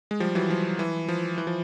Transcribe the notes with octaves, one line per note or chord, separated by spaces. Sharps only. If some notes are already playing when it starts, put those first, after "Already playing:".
G#3
F3 G3
E3 F#3
F3
E3
F3
E3
F3